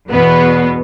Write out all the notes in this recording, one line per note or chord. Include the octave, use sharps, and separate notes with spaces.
E2 B2 B3